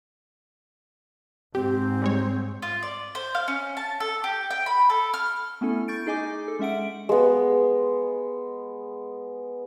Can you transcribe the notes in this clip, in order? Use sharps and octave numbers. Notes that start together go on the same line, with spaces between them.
G#2 C4 G4
G3 G#3 C#5
F4
D5
C5
F5
C#4
A5
A4
G4
G5
B5
A4
F6
A3 B3 C#4 E4 A4
C#6 G6 A6 D7
D#4 G#4 D#5 G#5 D6
A4
G#3 C#4 E5 F#5 D7
G#3 B3